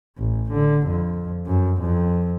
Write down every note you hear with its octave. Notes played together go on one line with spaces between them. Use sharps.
A1
D3
F2
F#2
F2